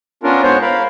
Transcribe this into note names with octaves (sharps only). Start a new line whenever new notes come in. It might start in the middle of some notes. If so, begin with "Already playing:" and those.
B3 C#4 D4 F4 A#4
G#2 B3 C5 C#5
A#4 F5 B5